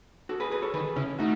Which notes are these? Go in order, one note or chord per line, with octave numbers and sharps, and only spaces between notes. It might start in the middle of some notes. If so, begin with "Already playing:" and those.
F#4 A4
G#4 B4
G#4 B4
A4 C#5
D#3 G#4 B4
C#3 C#4 E4
A3 D#4 F#4